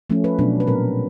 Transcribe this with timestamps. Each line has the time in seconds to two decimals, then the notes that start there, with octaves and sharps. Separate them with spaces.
0.10 F3 A3 C#4
0.24 B4
0.39 B2 F#3 B3 D4
0.60 B4
0.67 A#2 G3 C4 A#4